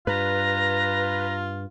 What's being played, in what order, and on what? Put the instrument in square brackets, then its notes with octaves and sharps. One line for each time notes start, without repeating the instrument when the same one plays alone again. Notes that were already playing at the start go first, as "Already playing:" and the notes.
[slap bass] G2 [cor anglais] F4 [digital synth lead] B4 [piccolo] A#5